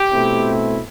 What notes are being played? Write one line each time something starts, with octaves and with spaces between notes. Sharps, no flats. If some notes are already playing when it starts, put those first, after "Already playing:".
Already playing: G4
B2 A3 C4 E4